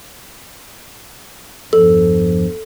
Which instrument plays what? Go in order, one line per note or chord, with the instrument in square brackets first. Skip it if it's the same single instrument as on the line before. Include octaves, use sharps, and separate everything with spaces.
[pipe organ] E2 G2 F3 [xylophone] A4